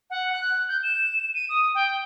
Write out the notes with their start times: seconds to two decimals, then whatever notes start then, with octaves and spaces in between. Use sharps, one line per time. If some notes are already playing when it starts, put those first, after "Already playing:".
0.10 F#5
0.32 F#6
0.69 G6
0.83 E7
1.34 D#7
1.49 D#6
1.75 G5